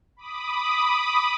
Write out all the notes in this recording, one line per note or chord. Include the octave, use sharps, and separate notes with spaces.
B5 D6 D#6